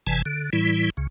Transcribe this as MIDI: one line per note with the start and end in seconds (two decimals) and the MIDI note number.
0.07 0.22 31
0.07 0.22 48
0.07 0.22 52
0.07 0.22 80
0.07 0.22 81
0.26 0.50 50
0.53 0.90 45
0.53 0.90 52
0.53 0.90 55
0.53 0.90 64
0.97 1.07 37
0.97 1.07 49